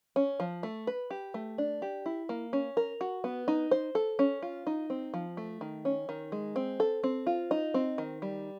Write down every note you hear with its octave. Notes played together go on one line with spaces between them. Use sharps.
C#4
F3
A3
B4
G4
A3
D4
G4
E4
A#3
C#4
A#4
F#4
B3
D#4
C5
A4
C#4
F4
D#4
C4
F3
A3
D#3
C#4
D#3
G#3
C4
A4
C4
F4
D#4
C4
D#3
G3